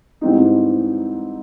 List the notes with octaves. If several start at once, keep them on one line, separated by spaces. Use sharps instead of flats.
G#2 E3 G3 C4 D#4